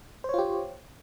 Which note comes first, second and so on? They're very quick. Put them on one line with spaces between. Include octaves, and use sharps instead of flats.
C5 C#5 F4 G4